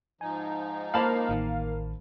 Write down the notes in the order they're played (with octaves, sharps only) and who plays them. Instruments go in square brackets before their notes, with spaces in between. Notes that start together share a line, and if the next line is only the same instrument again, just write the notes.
[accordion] G#2 F3 D#4 [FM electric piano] G#5
[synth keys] A#3 F5 [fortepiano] C5 A5 B5
[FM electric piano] A1 D#3